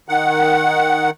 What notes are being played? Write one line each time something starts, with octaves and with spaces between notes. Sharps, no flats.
D#3 F#5